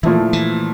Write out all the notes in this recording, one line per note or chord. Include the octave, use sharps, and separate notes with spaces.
A#2 E3 F3 A3 E4
E3